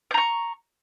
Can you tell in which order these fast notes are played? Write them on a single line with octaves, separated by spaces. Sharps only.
G6 A#5 C#6